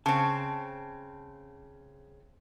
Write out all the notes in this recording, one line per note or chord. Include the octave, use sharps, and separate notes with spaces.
C#3 C4 A5